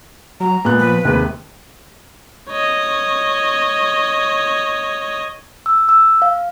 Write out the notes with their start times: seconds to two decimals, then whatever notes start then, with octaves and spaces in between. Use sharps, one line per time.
0.40 F#3 A#5
0.65 A#2 G#3 B3 F#6
0.80 F3 B4
1.05 D#2 C3 G#3
2.50 C#5 D#5
5.66 E6
5.89 E6
6.22 F5